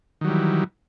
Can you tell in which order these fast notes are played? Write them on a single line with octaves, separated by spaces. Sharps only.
D#3 F#3 G3 E3